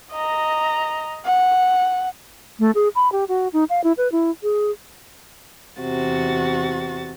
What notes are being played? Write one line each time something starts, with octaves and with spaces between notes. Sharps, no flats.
D#5 A#5
F#5
A3
G#4
B5
G4
F#4
D#4
F5
E4
B4
E4
G#4
E2 C3 F#4 A6